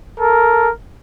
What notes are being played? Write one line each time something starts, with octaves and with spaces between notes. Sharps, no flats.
A4 A#4